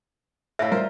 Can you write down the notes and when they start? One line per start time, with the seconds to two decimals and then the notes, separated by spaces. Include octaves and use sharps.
0.59 A2 E5 F5
0.72 G3 F4 A#4 C5